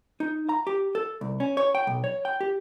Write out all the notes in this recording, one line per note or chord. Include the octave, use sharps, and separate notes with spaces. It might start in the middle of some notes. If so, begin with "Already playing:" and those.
D#4
A#5
G4
A4
C2
C#4
C#5
G5
B1
C#5
G5
G4